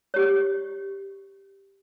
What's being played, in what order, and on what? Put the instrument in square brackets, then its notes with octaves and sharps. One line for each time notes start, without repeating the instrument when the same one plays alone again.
[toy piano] G4 C#5